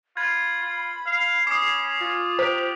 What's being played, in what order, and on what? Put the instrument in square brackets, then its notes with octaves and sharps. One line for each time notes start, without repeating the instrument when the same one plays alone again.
[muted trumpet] F4 [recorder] B5 [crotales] G#6
[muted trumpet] F4
F5
[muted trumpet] C#4 [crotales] D6 D#6 [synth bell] C7
[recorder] F4
[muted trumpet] G4 [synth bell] C5